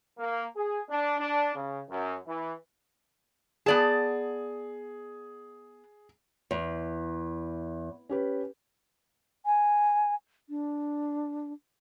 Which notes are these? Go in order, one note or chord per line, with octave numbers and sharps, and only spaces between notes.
A#3
G#4
D4
D4
C#3
F#2
E3
B3 G#4 D5 A5
E2
C#4 G4 B4
G#5
D4